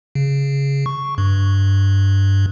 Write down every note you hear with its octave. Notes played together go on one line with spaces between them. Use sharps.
C#3
C#6
G2